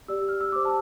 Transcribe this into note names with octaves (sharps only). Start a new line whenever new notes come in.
G4 D5 E6
F6
E6
G4 C5 D6
A5